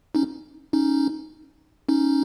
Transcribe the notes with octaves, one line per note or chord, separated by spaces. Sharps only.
C#4 D#4
C#4 D#4
C#4 D#4